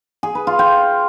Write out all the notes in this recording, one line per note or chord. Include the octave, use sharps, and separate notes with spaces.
G#4
B4
F4
G5